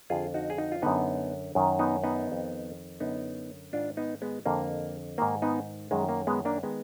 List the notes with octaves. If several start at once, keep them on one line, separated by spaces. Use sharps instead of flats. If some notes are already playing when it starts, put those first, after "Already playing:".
F2 D3 F4 G#4
D#4 F#4
G#4
D#4 F#4
F4
F#2 D3 B3 D#4
F#2 D#3
B3 D#4
B3 D#4
F2 D#3
F#2 D3 B3 D#4
G#2 D#3 D4 F4
B3 D#4
G#3 B3
F2 D3 A#3
G#2 D#3 A#3
B3 D#4
F#2 D#3 G#3
A#3
G#3 B3
A#3 D4
D#3 G#3 B3